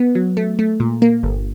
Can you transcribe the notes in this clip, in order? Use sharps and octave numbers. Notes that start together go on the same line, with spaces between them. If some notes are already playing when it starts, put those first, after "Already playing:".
Already playing: B3
F#3
A3
A3
A#2
A#3
G1